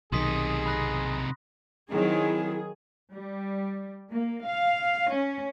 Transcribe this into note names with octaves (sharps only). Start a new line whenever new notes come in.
B1 C3 D#3 D#4 G#4 C6 D#6 B6
B5 F#6 A#6
D#3 F#3 C4 E4 G#4
G3
A#3
F5
C#4